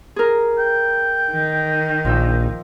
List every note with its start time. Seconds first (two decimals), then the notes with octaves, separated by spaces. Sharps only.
0.16 G#4 A#4
0.59 G5
1.31 D#3
2.05 A#1 F3 E6